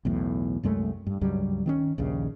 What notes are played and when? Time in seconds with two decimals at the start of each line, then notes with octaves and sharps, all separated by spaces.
0.05 B1 E2 A2
0.63 C2 F#2 G#3 A3
1.07 G2
1.21 C#2 G2 F#3 G3
1.66 D#3 C4 C#4
1.98 A#1 D#2 C#3